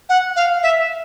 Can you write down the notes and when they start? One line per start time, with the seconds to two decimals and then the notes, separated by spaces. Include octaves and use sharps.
0.09 F#5
0.36 F5
0.63 E5